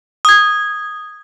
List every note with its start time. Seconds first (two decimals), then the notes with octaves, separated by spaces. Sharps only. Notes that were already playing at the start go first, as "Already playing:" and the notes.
0.25 D#6 G#6